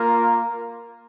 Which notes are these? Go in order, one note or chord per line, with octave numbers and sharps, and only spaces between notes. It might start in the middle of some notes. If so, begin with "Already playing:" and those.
Already playing: A#3 F4 A#4